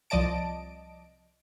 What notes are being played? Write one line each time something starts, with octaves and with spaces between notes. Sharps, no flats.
C2 F3 D5 D#5 A5 D7